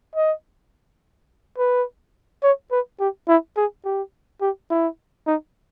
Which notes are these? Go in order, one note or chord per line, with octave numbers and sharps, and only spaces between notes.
D#5
B4
C#5
B4
G4
E4
G#4
G4
G4
E4
D#4